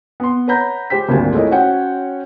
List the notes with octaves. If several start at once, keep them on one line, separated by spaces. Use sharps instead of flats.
B3 C6
B4 C#5 F#5 A#5 B5 G6
G#3 G4 C5 G5 B6
G#1 D2 A#2 G3 G#5 A5
G#3 A3 E4 A#4 C#5 D#5
C#4 F#4 C5 C#5 F#5 G5